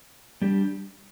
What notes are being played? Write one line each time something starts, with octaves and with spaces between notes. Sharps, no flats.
G3 D4 G4